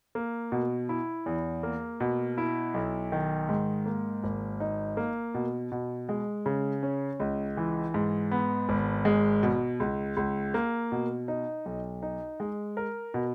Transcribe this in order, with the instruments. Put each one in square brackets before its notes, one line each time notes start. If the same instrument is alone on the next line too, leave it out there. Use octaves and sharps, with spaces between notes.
[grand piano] A#3
B2
E4
E2
A#3
B2
E4
B1
D#3
G#2
A#3
G#1
D#4
A#3
B2
B2
G#3
C#3
C#4
C#2
E3
G#2
B3
G#1
G#3
B2
C#2
C#2
A#3
B2
D#4
B1
D#4
G#3
A#4
B2